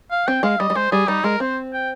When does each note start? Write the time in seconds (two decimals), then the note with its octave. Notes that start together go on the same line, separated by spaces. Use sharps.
0.11 F5
0.27 C4 G5
0.43 G#3 F5
0.60 G3 D#5
0.70 G3
0.75 G#3 C5
0.92 G3 G#4
1.08 G3 D#4
1.24 G#3 A#4
1.40 C4 C5
1.73 G5